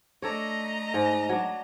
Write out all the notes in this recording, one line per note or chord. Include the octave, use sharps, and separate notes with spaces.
A3 D4 A4 C#5 D#5 A#5
G#2
F#3 D4